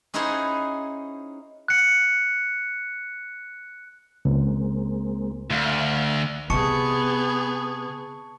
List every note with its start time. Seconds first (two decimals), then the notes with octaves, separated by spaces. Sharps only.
0.14 C#4 D#4 E4 F#4 G#4 C5
1.68 F#6 C#7
4.25 C#2 G#3 A#3 C4
5.51 D2 E5 F5 F6
6.50 C3 B3 G#4 A5 C#6 C#7